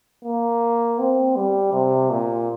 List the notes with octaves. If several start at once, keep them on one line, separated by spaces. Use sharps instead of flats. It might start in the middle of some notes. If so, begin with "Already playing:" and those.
A#3
C4
G3
C3
A#2